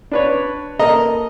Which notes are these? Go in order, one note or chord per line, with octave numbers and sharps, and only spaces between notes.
D4 B4 C#5
A#3 A4 D#5 A#5